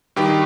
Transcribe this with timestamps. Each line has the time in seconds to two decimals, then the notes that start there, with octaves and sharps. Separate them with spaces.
0.16 G2 D#3 G4